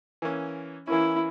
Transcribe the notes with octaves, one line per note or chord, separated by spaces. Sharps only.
E3 A#3 C#4
E3 A#3 C#4 E4